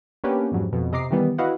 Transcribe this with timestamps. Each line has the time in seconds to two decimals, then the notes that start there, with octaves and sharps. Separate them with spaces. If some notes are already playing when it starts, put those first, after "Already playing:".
0.24 A#3 B3 C#4 D4 G4 B4
0.52 F2 G#2 F#3 G3
0.73 F2 B2
0.92 C3 D#5 A#5 D6 C7
1.11 D#3 E3 G3 B3
1.38 E4 F#4 B4 D#5 F5 F#5